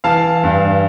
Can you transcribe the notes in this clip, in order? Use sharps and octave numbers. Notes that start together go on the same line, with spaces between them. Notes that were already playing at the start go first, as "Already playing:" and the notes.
E3 F5 A5
G2